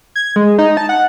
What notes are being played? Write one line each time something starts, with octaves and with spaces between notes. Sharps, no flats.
G#6
G#3
D#4
A5
F#5